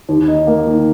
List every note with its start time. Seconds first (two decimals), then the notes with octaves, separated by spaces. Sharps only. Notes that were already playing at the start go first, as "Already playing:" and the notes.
0.09 D#2
0.28 D#4
0.47 A#3
0.67 D#3